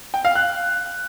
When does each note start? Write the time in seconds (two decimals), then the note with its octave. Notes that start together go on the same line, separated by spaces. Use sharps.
0.14 G5
0.25 F5
0.35 F#6